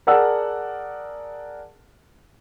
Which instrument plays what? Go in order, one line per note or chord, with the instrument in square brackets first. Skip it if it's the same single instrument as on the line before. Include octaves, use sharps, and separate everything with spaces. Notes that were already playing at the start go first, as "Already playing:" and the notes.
[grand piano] G#4 A#4 D5 F#5 A5 E6